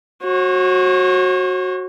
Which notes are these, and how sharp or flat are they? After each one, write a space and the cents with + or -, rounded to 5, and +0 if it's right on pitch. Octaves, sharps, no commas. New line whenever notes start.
F#4 -5 C#5 -45